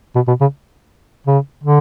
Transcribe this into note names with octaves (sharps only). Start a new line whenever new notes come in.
B2
B2
C#3
C#3
D3